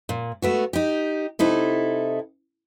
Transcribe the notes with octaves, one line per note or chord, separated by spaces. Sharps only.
A#2
A3 B3 F#4
D#4 G4
C3 D#4 E4 A4